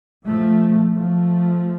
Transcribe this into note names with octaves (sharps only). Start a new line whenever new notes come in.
F3 A3
F3 A3